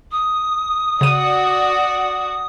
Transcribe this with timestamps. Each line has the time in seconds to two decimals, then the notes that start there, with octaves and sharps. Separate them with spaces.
0.11 D#6
1.01 C#3 F#4 D5 D#7